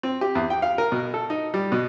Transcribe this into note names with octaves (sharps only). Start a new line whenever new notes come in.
C4
G4
E2
G5
F5
A#4
B2
A4
D#4
G3
B2